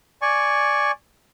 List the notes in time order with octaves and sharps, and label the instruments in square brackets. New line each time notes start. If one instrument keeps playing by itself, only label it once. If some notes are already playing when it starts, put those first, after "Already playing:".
[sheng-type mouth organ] D5 G#5 C#6